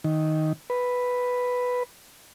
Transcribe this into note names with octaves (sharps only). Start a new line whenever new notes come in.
D#3
B4